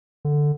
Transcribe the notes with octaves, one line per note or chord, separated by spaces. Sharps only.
D3